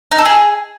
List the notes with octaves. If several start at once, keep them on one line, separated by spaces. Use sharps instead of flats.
D#4
A4
G#4